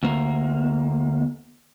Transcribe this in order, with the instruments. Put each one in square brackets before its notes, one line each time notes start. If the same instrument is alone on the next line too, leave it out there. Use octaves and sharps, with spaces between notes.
[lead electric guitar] D2 A#3